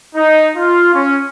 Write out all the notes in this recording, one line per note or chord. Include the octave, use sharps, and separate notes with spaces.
D#4
F4
C#4